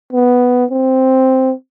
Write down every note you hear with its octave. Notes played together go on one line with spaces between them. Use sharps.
B3
C4